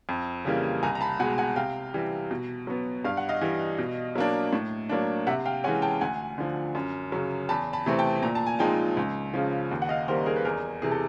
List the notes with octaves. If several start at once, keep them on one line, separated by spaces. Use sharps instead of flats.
F2
C#3 E3 G3 A#3
C2 G#5 A#5
A#5
A5 B5
B2 G#3 F#5 G#5
F#5 G#5
C3 F5 G5
E3 G3
B2
F#3 B3
G2 F5
F#5
D#5 F5
E3 G3
B2
F#3 A#3 D4
A2
F#3 A#3 D4
C3 E5 F#5
F5 G5
E3 G#3 C#4 F#5 G#5
G5 A5
D2 F#5 G#5
D3 F3
F#2
C#3 F#3
E2 A5 B5
A5 B5
C3 E3 A3 C4
G5 A5
A#2 A#5
A5
G#5
F3 G#3 C4 D#4 G5 A5
C#2
C#3 F3
D#2
F#5
D#5 F5
D#3 G3 A#3 A#4 C5
G#4 A#4
B4
E2 G#4 A#4
C3 E3 G#4
A4